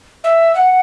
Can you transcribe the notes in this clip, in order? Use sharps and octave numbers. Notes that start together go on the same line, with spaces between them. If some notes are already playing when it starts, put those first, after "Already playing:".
E5
F#5